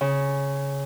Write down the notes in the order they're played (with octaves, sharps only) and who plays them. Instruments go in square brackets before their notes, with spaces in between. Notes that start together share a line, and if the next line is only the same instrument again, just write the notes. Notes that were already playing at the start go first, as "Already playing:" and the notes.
[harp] C#3